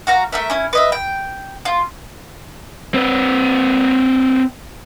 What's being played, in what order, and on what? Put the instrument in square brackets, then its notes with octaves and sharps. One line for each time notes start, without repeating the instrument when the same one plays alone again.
[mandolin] F#4 F5 A#5
A3 A#4 E5
C#4 E4
B4 D#5 E5
G5
F4
[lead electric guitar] C4 B4